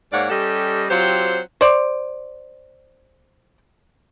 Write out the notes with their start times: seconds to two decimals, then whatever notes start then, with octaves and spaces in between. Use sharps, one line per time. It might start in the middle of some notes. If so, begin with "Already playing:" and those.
0.13 G#2 A#3 C#5 D5 F#5
0.30 G3 C#4 G4 A4 D#5
0.90 F#3 C4 F4 G4 C5
1.61 C5 D5